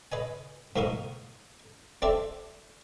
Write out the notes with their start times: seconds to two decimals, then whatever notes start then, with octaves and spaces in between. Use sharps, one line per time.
0.12 B4 D#5 G#5
0.76 G#2 B2 A#3 F#4 A#4 D#6
2.02 C4 G4 A4 D5 E5